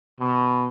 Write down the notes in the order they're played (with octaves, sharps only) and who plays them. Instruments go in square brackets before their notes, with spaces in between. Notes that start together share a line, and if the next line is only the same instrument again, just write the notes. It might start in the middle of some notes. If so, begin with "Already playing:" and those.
[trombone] B2